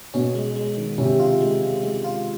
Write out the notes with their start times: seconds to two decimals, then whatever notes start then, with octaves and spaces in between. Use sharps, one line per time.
0.14 B2 C#4
0.35 G#3
0.56 G#3
0.77 D#3
0.98 C3 C#4
1.20 F4
1.41 G#3
1.62 G#3
1.83 G#3
2.04 F4